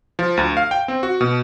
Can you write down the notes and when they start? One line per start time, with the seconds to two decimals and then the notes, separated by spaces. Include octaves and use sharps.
0.19 F3
0.37 D2
0.57 F5
0.71 G5
0.88 C4
1.03 F#4
1.21 B2